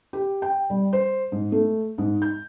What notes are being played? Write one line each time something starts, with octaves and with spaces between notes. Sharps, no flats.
G4
G5
G3
C5
G#2
A3
G#2
G6